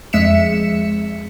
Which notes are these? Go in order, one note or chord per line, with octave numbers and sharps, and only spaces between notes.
F2 G#3 E5 B6 C#7 E7